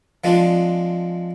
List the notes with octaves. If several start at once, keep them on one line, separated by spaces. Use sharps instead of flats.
F3 G#3 C4 D4